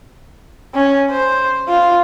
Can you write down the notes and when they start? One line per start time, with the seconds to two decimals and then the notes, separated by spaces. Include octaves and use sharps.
0.75 C#4
1.12 C5
1.69 F4